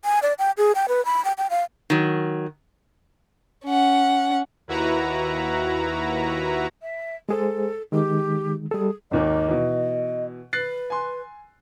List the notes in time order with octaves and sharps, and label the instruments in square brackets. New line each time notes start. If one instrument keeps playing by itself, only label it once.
[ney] G#5
D5
G5
G#4
G5
B4
B5
G5
G5
F5
[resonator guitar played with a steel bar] D#3 F#3
[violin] C#4 F#5
[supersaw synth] D#2 E4 F#4 B4 A#5
[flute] E5
[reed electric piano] G#3 G#4 C5 [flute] A4
[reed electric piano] D#3 G#3 [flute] G4
[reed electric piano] G3 A4 [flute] G#4
[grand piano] G#1 D#2 D#3 [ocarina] D#5
[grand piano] B2 E3
[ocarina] B4 [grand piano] F#6 A6 C7
[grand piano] G#5 C6